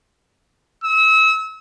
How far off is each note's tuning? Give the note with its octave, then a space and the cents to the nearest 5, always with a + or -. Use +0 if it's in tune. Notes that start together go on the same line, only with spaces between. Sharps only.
E6 -35